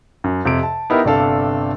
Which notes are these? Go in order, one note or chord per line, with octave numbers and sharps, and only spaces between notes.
F#2
F2 C3 D7
A5
B3 D#4 E4 G4 A#4
G1 C3 D4 A4 F5